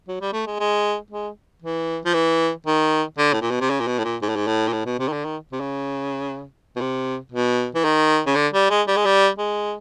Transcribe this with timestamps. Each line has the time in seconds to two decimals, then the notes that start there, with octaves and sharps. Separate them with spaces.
0.08 F#3
0.21 G3
0.33 A3
0.46 G#3
0.60 G#3
1.11 G#3
1.62 E3
2.05 F3
2.14 E3
2.66 D#3
3.18 D3
3.33 A2
3.42 A#2
3.51 B2
3.61 C3
3.70 C#3
3.80 A#2
3.87 B2
3.99 A2
4.04 A#2
4.22 G#2
4.29 A2
4.36 G#2
4.47 A2
4.68 A#2
4.73 A2
4.86 B2
4.99 C3
5.08 D#3
5.12 D3
5.25 D#3
5.52 C3
5.60 C#3
6.76 B2
6.81 C3
7.32 B2
7.75 E3
7.84 D#3
8.26 C#3
8.35 D3
8.53 G3
8.70 G#3
8.87 G3
8.96 G#3
9.06 G3
9.38 G#3